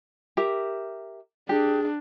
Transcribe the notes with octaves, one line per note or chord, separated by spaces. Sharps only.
G4 A#4 E5
D4 G4 G#4